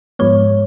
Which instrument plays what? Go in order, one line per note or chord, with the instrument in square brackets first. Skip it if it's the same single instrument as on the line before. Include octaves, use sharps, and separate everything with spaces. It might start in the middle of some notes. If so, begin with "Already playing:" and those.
[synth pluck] G#2 F3 G#3 B3 C#5